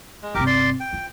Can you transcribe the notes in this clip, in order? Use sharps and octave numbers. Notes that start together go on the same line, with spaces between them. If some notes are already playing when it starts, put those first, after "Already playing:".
G#3
G1 C3 G4 A#4 D6
D5 C6
G5
F4